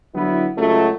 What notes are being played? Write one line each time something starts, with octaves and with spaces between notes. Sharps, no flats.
D3 F#3 B3 E4
C#2 F#3 A3